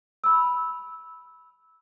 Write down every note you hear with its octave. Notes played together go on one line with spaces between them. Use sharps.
B5 E6